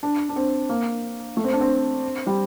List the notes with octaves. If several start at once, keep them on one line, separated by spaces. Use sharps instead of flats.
D4
D4
C4
A#3
A3
C4
D4
C4
G3